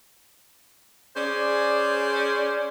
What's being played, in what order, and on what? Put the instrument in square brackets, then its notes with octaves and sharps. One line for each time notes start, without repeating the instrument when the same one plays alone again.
[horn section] C#4 G#4 C5 D5